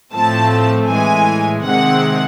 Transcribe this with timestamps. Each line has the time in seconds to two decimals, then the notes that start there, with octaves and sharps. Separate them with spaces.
0.13 A2 F3 A3 C4 A5
0.89 A2 E3 G#3 G#5
1.64 C3 D#3 G#3 C4 F#5